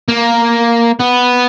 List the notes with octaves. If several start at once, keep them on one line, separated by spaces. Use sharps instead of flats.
A#3
B3